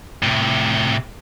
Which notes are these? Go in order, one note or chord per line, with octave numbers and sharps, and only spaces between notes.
A2 C3